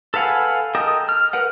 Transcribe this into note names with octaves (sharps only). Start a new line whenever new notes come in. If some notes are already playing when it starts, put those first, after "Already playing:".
A4 B4 F5 F#5 G#5
A4 A#4 D#5 G5 D#6
F6
A#4 B4 F#5